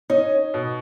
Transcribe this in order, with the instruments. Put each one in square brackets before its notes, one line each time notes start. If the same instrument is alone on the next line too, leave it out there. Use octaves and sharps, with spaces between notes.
[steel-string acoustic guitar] C#4 C#5 [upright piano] D#4
[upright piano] B2